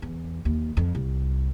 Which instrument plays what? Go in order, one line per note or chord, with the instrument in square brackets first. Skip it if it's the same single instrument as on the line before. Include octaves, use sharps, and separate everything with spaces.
[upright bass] E2
D#2
F2
C2